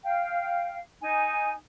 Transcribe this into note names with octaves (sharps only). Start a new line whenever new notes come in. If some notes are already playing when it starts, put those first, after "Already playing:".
F5 G5
D#4 G#5